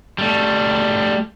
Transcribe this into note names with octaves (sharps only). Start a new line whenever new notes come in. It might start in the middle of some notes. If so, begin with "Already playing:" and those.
G3 A3